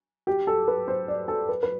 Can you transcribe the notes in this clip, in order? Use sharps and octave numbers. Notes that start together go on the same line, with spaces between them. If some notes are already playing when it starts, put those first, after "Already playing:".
G4
A4
B4
C5
D5
A4
B4
B4